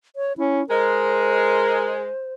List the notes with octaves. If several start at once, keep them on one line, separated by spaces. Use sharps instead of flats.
C#5
C#4 E4
G#3 A#4 C5